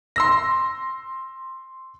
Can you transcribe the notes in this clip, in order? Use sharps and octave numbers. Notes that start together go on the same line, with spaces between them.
C6 E6 A#6